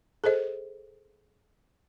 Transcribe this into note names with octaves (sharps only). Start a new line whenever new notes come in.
G#4 A4 C5 D#5